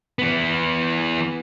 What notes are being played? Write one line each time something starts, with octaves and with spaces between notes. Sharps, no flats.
E3 B3